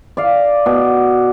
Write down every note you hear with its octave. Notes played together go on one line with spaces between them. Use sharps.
D5 F5
B2